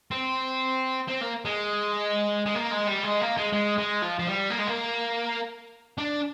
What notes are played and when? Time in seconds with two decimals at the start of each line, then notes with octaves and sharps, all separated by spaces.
0.11 C4
1.08 C4
1.21 A#3
1.45 G#3
2.46 G#3
2.55 A#3
2.72 G#3
2.88 G3
3.04 G#3
3.21 A#3
3.37 G#3
3.53 G#3
3.78 G#3
4.02 F3
4.19 F3
4.27 G3
4.50 A#3
4.59 G#3
4.67 A#3
5.98 D4